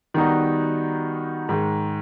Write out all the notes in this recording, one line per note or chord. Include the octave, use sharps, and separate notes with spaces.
D#3 G3 B3 D#4 F#4
G#2 D#3 G#3